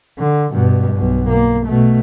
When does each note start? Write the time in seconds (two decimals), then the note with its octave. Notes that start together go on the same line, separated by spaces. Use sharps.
0.19 D3
0.51 G2 B2
0.95 B1 B2
1.29 A#3
1.66 B2 A3